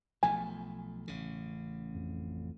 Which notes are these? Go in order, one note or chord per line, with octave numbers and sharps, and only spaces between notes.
B1 F3 A3 G#5
A1 C#3
F2